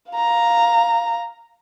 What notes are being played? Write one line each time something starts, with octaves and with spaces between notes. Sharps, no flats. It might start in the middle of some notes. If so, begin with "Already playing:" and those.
F5 A#5